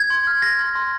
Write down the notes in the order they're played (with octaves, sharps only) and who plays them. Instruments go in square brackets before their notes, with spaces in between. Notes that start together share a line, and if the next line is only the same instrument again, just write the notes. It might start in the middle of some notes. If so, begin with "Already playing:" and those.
Already playing: [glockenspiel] G#6
C6
F6
F6 A#6
C6
C6